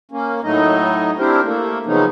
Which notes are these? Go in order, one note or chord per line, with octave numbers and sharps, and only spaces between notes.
A#3 C#4
A2 F#3 A3 D#4 D#5
C4 D4 E4 G4 A#4 C5
A3 A#3
C#3 F3 F#3 B3 C#4 D#4